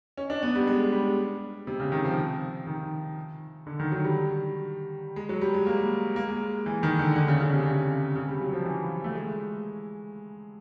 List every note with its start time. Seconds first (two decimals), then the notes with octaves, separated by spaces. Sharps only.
0.17 C#4
0.30 D4
0.43 B3
0.55 G3
0.67 G#3
0.80 G#3
0.92 G3
1.67 C3
1.80 C#3
1.92 D#3
2.04 F3
2.67 D#3
3.67 D3
3.80 D#3
3.92 F#3
4.04 G3
5.16 G#3
5.29 F#3
5.41 G3
5.54 G#3
5.67 A#3
6.16 A#3
6.28 G#3
6.66 E3
6.83 D#3
6.99 D3
7.16 D3
7.28 C#3
7.41 C#3
7.54 C3
7.66 C#3
8.15 C#3
8.28 G3
8.41 F#3
8.53 F3
8.66 E3
9.04 A3
9.15 G#3